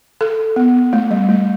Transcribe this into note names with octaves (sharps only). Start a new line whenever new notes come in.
A4
B3
A3
G3
A3